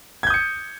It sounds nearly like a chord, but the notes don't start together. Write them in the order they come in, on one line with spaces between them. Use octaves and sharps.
G#6 G6 D#6 C#7